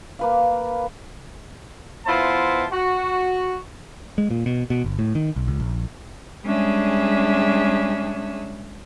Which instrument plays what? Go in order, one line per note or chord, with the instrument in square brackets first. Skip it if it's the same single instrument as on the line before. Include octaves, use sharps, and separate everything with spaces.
[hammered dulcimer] A#3 B4 F5
[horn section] E3 B3 E4 F4 C5 A5
F#4
[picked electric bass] G#3
A#2
B2
B2
G1
A2
D#3
B1
C#2
A#1
[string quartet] G3 G#3 C#4 D4 G#4 E5